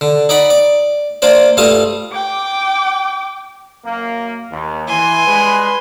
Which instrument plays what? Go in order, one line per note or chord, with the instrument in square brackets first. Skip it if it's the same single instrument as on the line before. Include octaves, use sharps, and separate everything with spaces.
[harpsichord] D3
D#4 D5 F#5 B5
D5
A#3 D4 C5 D5
G2 G3 A3 F4 A5 D#6
[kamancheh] G5 D6
[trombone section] F#2 A#3
D#2
[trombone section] E3 [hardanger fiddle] G#5 C6
[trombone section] G3 G#3 B4